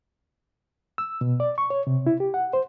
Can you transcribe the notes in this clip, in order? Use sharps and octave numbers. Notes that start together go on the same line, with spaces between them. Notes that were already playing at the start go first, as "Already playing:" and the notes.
E6
B2
D5
C#6
C#5
C3
E4
G4
F#5
C5